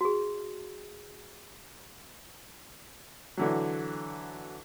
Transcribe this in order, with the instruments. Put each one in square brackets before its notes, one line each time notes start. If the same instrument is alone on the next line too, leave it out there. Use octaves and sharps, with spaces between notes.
[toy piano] F#4 G#4
[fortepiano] D3 E3 F#3